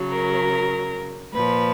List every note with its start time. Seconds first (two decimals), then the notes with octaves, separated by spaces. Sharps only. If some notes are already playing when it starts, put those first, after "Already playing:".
Already playing: C#3 F#3
0.12 A#4
1.34 A#2 F3 B4